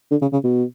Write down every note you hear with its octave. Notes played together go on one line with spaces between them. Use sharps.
D3
C#3
C#3
B2